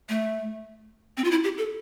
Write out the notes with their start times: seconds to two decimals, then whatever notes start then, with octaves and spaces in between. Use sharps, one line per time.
0.09 A3
1.17 C4
1.24 F4
1.31 E4
1.44 G4
1.58 A4